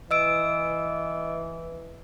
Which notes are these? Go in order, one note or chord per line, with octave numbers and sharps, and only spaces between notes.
E3 D#5 E6 D7